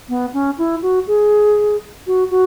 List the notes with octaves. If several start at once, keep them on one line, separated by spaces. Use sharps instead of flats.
B3
C#4
E4
F#4
G#4
F#4
F#4